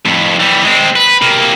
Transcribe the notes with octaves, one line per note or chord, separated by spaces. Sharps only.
F2 A2
E3 G3
G#3 C4
B4
C3 A#3